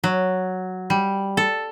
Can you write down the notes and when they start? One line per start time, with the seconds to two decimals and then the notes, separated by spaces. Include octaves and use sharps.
0.04 F#3
0.90 G3
1.37 A4